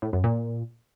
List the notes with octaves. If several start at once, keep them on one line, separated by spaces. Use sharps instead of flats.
A2
F#2
A#2